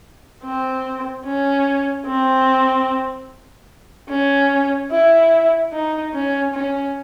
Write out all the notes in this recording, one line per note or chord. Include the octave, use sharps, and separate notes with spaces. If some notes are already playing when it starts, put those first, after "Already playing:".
C4
C#4
C4
C#4
E4
D#4
C#4
C#4